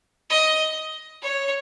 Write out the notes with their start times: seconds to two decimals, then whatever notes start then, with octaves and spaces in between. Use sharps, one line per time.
0.30 D#5
1.22 C#5